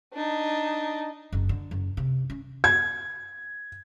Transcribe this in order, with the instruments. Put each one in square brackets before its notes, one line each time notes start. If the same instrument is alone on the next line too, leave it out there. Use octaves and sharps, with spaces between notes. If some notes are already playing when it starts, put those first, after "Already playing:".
[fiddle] D4 D#4
[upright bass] F#1
D3
F#1
C3
C#4
[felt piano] G#6